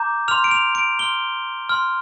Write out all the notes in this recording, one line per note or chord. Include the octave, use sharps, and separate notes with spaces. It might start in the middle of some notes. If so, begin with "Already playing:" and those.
Already playing: A#5 D6 G6
C6 F6 F7
D7
F7
D7
C6 F6 G7
C6 F6